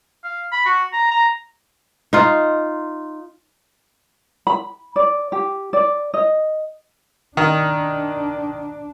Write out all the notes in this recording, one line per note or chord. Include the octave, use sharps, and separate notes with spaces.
F5
B5
F#4
A#5
A#5
D#4 F4
B5
D5
G4
D5
D#5
D#3 D4